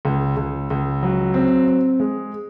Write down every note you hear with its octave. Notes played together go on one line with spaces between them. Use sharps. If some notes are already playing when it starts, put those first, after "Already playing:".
C#2
C#2
C#2
F#3
C4
C4
G#3